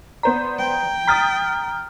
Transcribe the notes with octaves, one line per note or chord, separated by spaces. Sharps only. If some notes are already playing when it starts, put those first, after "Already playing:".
B3 C5 D5 A#5
G5
A#5 D#6 F6 A6 B6